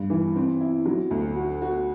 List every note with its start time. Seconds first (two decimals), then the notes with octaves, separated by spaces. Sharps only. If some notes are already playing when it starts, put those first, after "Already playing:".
Already playing: G2
0.10 E3
0.36 C4
0.61 E4
0.85 F#3
1.11 D2
1.36 F#4
1.62 F#4